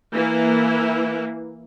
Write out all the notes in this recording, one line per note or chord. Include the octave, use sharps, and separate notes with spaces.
E3 A#3 E4